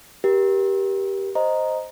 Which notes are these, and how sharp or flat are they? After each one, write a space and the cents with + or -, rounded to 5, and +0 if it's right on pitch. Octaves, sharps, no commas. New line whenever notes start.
G4 +0 A#4 +35
C5 +0 D#5 +0 A#5 +0